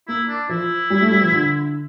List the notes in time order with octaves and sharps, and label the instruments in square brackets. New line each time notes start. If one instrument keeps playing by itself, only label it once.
[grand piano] A#3 [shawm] E4
[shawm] D4
[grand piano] F3 [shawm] E4
[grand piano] G3
A3
G3
F3
D3